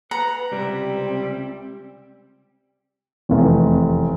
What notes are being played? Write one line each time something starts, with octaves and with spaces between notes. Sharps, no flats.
B4 F#5 A#5
C#2 C3 G3 C4 E4
F1 E2